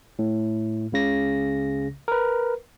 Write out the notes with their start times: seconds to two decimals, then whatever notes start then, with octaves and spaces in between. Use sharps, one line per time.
0.19 A2
0.92 C#2 C#3 A#6
2.08 A#4 B4